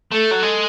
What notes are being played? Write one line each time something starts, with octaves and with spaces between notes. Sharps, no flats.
A3 A4
F#3
G#3